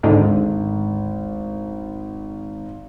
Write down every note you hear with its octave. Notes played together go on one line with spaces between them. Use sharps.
G#1 D2 G#2 D3